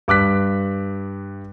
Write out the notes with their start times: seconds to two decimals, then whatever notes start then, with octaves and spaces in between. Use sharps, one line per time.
0.08 G2 D6 F#6 B6